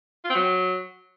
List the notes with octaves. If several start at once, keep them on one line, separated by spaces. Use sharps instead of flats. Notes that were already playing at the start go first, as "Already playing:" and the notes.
F4
C4
F#3